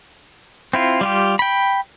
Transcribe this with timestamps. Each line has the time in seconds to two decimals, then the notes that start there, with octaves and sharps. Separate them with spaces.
0.73 C4 E4 F4
1.01 G3 F4 G4
1.39 G5 B5